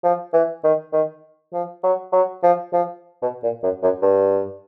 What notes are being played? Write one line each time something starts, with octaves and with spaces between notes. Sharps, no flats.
F3
E3
D#3
D#3
F3
F#3
F#3
F3
F3
B2
A#2
F#2
F#2
G2